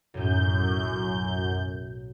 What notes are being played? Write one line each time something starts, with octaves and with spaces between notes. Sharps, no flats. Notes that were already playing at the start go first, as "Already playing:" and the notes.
B1 F#2 A2 G6